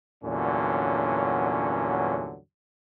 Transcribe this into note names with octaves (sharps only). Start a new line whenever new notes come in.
E2 G2 A#2 D3 F#3 C#4